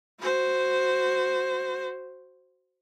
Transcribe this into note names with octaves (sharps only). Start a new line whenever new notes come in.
F#4 C5